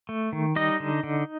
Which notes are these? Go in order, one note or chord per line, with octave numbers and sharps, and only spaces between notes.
A3
D#3
G3 D#4 D#5
D3
D3